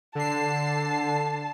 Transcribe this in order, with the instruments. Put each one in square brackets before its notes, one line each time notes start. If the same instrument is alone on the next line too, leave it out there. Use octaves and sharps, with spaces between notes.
[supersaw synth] D3 C7 [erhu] A5